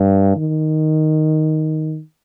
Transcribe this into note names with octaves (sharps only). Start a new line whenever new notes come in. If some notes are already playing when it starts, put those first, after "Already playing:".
Already playing: G2
D#3